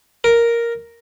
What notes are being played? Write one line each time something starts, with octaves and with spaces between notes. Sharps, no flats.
A#4